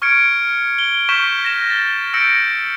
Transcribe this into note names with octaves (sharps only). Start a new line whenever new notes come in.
C#6 F6 G#6 C#7 D7
G7
C#6 F6 G6 B6 E7
A#6 E7
A6 G7
E6 G6 A#6 C#7 D7